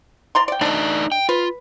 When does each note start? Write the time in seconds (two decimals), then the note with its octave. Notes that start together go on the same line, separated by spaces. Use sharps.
0.35 D5 A#5 C6
0.48 D5 G5
0.61 A3 D4 D#4 D5 D#5
1.12 G5
1.29 F4 B4